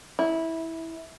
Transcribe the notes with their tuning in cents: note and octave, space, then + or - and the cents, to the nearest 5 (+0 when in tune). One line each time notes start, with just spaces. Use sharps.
E4 -15